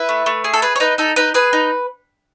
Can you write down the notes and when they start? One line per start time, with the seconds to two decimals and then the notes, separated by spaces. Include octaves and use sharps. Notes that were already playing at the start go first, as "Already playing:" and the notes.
Already playing: E4 B4
0.09 A3
0.26 A3
0.44 G#4
0.54 A4
0.62 G#4 B4
0.76 C#5
0.80 D#4 B4
0.98 D#4 A4
1.16 D#4 B4
1.34 G#4 B4
1.53 D#4